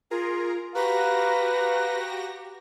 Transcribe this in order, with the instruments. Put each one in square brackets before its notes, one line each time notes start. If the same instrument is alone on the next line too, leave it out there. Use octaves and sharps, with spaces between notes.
[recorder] F4 [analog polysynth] G#4 A#4 A#5
[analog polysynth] F#4 G4 A#6 [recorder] B4 [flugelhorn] F5 [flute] A#5